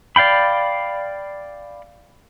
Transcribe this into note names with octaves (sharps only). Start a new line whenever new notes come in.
D5 F5 G5 B5